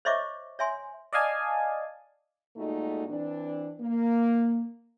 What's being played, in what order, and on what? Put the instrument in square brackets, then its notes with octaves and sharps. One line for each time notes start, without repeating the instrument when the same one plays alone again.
[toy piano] C5 C#5 D#5 E5 C#6 D6
C#5 E5 G#5 C6
[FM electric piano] D5 D#5 F5 G#5 A5
[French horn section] A#2 G#3 A3 D#4 F#4
E3 C4 D4
A#3